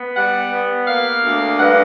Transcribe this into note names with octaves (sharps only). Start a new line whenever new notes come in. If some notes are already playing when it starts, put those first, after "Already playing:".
Already playing: B3
G3 F#5
B3
A#3 F5
D2
G2 F#5